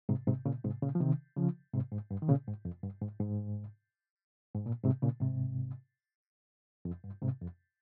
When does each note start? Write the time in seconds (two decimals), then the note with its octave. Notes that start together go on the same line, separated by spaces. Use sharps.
0.09 G#2 C3
0.27 G#2 C3
0.46 A#2 C#3
0.64 G#2 C3
0.82 A#2 C#3
0.95 F3
1.00 C3 D#3
1.37 C#3 F3
1.74 G#2 C3
1.92 G#2
2.11 G2
2.22 D#3
2.28 A#2 C#3
2.47 G#2
2.65 F2
2.83 G2
3.02 G#2
3.19 G#2
4.55 G#2
4.66 A#2
4.84 G#2 C3
5.02 A#2 C#3
5.21 G#2 C3
6.85 F2
7.04 G2
7.22 G#2 C3
7.41 F2